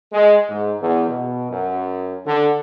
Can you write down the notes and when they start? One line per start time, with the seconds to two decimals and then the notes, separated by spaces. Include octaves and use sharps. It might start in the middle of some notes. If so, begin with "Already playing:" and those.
0.13 G#3
0.48 G#2
0.80 E2
1.09 B2
1.50 F#2
2.26 D3